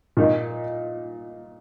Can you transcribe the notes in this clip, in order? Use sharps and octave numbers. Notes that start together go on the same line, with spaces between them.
A#2 A#3 D#4